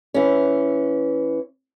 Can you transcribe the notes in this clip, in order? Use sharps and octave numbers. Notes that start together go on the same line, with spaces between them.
E3 C#4